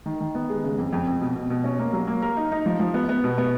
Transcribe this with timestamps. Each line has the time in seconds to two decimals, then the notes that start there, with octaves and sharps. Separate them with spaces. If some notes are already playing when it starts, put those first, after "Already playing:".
0.06 D#3
0.20 D#3
0.35 B3
0.49 G#3
0.64 C#3
0.78 F2
0.93 F2
1.07 F2
1.21 B2
1.36 B2
1.50 B2
1.64 C#4
1.79 A#3
1.93 F#3
2.07 A#3
2.22 A#4
2.37 D#4
2.52 D#4
2.66 F3
2.80 F3
2.94 B3
3.09 B3
3.24 B2
3.38 B3